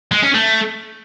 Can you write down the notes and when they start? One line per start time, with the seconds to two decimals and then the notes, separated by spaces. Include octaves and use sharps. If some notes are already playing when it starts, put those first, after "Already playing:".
0.12 G#3
0.23 C#4
0.34 A3